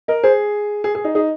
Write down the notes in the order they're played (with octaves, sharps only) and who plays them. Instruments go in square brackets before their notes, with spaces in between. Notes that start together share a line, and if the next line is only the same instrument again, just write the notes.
[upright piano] A#4 [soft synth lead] D#5
[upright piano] G#4 [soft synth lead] C5
[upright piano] G#4
G#4
D#4
[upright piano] D#4 [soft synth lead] G#4